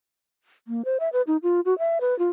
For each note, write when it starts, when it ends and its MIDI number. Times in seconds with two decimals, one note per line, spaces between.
0.68 0.85 58
0.85 0.98 72
1.00 1.09 76
1.13 1.22 71
1.27 1.37 63
1.43 1.61 65
1.65 1.77 66
1.79 1.99 76
2.01 2.17 71
2.19 2.29 65